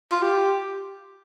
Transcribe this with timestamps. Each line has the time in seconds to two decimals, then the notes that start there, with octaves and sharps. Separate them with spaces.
0.12 F4
0.22 G4